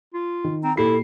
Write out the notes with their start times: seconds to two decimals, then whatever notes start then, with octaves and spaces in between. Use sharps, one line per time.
0.14 F4
0.44 D#3
0.64 C4 A#5
0.77 A#2 E4 G4 A4 C7